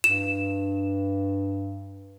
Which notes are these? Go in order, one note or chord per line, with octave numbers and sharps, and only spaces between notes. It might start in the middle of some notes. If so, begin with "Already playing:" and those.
G2 E7